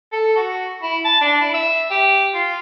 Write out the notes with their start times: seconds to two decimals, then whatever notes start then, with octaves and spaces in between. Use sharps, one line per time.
0.13 A4
0.36 F#4
0.82 E4
1.05 A5
1.21 D4
1.40 E4
1.54 E5
1.90 G4
2.34 F4